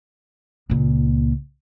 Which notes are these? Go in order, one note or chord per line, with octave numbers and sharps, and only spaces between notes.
C#2 A#2